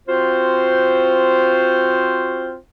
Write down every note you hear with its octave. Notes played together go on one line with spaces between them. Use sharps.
C4 F4 F#4 C5